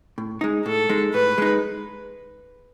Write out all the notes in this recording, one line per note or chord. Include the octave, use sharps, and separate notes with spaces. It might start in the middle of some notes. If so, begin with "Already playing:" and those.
A2
G#3 D#4
A2 A4
G#3 D#4
A2 B4
G#3 D#4